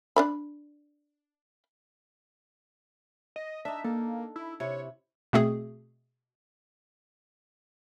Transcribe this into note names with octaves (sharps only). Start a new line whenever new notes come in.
D4 D5 B5
D#5
D4 D#4 E5
A#3 A4
E4
C3 E4 C#5
B2 A3 C4 G#4